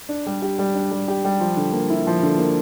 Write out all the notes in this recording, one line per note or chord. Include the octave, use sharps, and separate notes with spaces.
D4
G3
G4
G3
D4
G3
G4
G3
F3
D3
A#3
E4
F3
D3
A#3